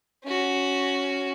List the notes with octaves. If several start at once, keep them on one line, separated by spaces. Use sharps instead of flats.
C#4 F#4